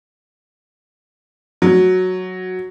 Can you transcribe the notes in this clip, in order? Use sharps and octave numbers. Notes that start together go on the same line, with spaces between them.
F#3